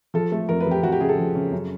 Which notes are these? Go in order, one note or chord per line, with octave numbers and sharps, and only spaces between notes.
F3 A4
A3
F2 A#4
B4
F2
G4
F2 F#4
G4
C#3 G#4
A4
F3
C#3
F#2